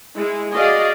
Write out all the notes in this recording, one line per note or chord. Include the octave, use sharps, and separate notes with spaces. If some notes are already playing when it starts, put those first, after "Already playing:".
G#3 E4
F#4 G#4 D5 D#5 F5